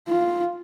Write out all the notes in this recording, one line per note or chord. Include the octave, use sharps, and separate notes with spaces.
F4